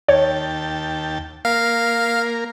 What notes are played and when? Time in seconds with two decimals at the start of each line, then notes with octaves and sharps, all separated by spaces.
0.09 D#2 C#5 G5 A5
1.45 A#3 A#4 F5